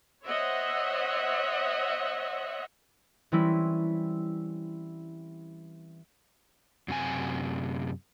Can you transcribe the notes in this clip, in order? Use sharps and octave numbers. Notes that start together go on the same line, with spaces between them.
C5 C#5 D#5 E5 F#5
E3 G3 C4 C#4 E4
F#2 C3 G#5